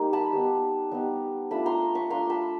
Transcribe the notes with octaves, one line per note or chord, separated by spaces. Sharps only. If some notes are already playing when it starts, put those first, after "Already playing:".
Already playing: G3 A#3 D#4
A5 B5
G3 B3 D#4
G3 B3 D#4
A3 D4 F4 A5 B5
A#5 C6
B5 C#6
A3 D4 F4 A#5 C6
A5 B5